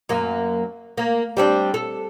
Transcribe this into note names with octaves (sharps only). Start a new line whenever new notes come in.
F#2 A#3
A#3
G3 C4 D4
A4